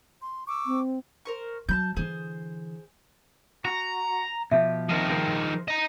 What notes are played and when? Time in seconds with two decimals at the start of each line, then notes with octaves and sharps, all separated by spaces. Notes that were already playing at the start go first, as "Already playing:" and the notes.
0.21 C6
0.47 C#6 D6 E6
0.66 C4
1.25 A#4 C5 C#6
1.69 F#3 A5 B5 G6
1.96 D3 E3 G#4 C5
3.65 F#4 A#5
4.51 B2 F3 G4 E5
4.89 D#3 F3 C4 A#4 D#5
5.09 G#4 A#4 C5
5.68 D#5 A#5